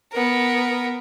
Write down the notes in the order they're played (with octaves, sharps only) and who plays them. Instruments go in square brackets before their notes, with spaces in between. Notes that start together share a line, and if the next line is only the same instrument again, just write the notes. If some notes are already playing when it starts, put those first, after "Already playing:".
[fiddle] B3 A#4